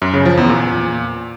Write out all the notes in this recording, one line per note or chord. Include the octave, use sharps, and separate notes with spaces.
F#2
C#3
F3
E2
A#2